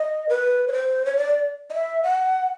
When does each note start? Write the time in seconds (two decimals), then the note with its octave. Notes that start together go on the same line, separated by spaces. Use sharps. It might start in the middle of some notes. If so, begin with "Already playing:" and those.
Already playing: D#5
0.29 B4
0.68 C#5
0.72 C5
1.06 C#5
1.17 D5
1.70 D#5
1.74 E5
2.03 F#5